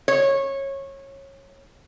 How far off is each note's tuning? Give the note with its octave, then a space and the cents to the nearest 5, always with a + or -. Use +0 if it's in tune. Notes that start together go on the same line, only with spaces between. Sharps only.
C#5 -20